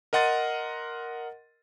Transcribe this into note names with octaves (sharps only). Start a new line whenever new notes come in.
A#4 D#5 F#5 C6 A6 D#7